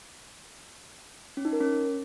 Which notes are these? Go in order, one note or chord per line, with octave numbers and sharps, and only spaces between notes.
C#4
D#4
A#4
C#4